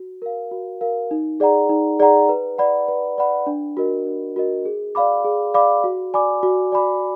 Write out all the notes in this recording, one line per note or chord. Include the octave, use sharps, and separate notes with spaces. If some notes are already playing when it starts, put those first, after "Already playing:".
Already playing: F#4
A#4 F5
F#4
A#4 F5
D#4
G#4 D5 F#5 A#5
D#4
G#4 D5 F#5 A#5
B4
D5 F#5 B5
B4
D5 F#5 B5
D4
F#4 A#4 D#5
D4
F#4 A#4 D#5
G#4
D5 F5 B5 D6
G#4
D5 F5 B5 D6
F#4
D5 G#5 B5 D6
F#4
D5 G#5 B5 D6